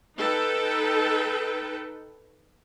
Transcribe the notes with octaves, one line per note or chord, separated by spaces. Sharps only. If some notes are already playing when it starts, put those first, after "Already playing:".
D#4 A4 B4 G5